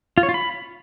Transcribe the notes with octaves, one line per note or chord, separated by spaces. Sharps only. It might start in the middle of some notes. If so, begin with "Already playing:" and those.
F4
C#5
F4
B5